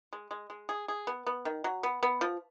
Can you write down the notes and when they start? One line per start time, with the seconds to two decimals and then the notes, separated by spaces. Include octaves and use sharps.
0.13 G#3
0.31 G#3
0.50 G#3
0.69 G#4
0.88 G#4
1.07 B3
1.27 B3
1.45 D#3
1.64 F#3
1.83 B3
2.03 B3
2.21 F3